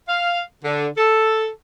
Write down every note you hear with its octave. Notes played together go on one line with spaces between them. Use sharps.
F5
D3
A4